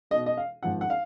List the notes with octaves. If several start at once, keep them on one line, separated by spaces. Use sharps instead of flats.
B1 B2 D#5
D#5
F5
G#1 G#2 F3 F#5
F#5
F5